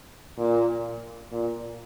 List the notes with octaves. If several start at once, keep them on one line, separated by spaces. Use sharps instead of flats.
A#2
A#2